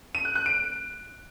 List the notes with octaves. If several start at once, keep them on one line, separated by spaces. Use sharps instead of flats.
D#7
F#6
F#6
D7